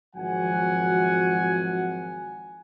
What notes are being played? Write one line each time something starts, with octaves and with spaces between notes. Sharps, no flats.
G#1 F3 F#3 F#4 F#5 G#5